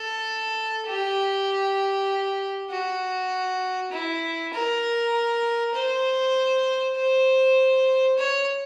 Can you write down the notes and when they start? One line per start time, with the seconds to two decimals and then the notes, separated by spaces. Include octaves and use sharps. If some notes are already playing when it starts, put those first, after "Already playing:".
Already playing: A4
0.87 G4
2.70 F#4
3.91 E4
4.53 A#4
5.74 C5
6.96 C5
8.18 C#5